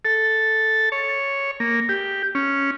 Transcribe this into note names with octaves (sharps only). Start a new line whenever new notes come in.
A4
C#5
A#3
G4
C#4